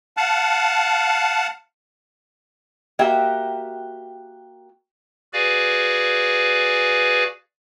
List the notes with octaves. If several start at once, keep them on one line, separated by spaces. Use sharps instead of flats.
F5 F#5 A5
A#3 F#4 G4 E5 G5
F#4 G#4 B4 D5 F5 G#5